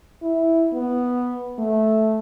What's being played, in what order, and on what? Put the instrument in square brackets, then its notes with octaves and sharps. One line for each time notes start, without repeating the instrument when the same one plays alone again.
[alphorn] E4
B3
A3